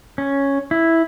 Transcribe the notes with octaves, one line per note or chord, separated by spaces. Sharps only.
C#4
E4